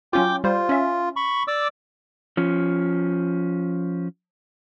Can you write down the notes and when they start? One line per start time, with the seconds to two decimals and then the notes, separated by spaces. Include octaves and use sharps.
0.13 F#3 C#4 F4 G5 D6
0.44 G3 F4 C5
0.69 C#4 E5
1.16 B5 C#6
1.48 D5 D6 E6
2.37 F3 C#4